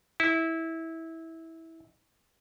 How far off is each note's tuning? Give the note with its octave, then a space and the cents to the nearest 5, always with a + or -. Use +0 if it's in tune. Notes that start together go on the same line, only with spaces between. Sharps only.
E4 -20